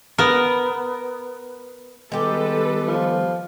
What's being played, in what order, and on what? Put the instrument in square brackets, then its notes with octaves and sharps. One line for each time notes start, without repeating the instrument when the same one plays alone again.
[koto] B3 A#4
[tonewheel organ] D#3 G3 B3 [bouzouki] G#3 G4 [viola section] A4 B4
[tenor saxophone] F3